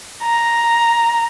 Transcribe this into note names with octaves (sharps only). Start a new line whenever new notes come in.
A#5